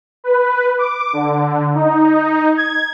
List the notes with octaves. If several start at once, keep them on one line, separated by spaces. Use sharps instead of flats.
B4
D6
D3
D#4
G#6